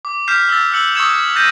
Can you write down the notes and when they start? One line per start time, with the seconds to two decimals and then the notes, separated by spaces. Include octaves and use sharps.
0.05 D6
0.27 F6 G6 B6 C7 E7
0.49 E6 A6
0.72 E6 F#6 C#7 F#7
0.95 C#6 D#6 E6 G#6 C#7 E7
1.36 F#6 G6 A6 A#6 C7 D#7